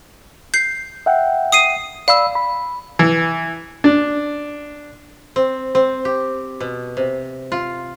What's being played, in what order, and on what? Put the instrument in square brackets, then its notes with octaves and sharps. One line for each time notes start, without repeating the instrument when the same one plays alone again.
[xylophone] G6 C7
[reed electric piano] E5 F#5 G5
[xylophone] D#6 C7 D#7
[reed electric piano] D5 B5 E6 [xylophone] F5
[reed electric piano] B5
[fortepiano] E3
D4
[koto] C4
C4
G4
B2
C3
F4